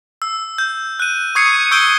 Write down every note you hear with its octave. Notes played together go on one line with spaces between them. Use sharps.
E6
G6
F#6 D#7
C#6 D#6 G#6 C7 C#7
C#6 E6 G6 C#7 D7 G7